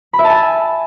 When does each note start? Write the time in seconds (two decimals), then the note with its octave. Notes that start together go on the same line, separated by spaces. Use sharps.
0.13 B5
0.19 E5
0.24 A5
0.30 G#5